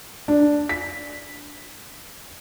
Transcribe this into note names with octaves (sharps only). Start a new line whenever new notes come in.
D4
B6